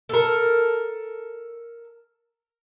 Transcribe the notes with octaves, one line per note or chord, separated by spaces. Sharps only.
A4 A#4